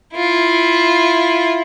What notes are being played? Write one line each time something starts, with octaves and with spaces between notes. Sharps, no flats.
E4 F4